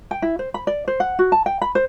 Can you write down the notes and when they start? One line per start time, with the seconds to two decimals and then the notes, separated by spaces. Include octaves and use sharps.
0.11 G5
0.22 E4
0.39 C5
0.54 B5
0.67 D5
0.88 C5
1.00 F#5
1.19 F#4
1.32 A5
1.46 G5
1.62 B5
1.75 C5